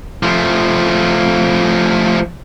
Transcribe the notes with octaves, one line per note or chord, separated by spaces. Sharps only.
F3 A3